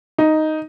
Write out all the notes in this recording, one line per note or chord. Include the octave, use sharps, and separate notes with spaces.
D#4